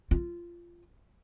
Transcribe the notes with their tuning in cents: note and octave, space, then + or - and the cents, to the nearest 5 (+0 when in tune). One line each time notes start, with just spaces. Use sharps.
F4 -15